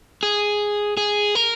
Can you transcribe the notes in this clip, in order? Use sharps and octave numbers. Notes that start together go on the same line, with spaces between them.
G#4
G#4
A#4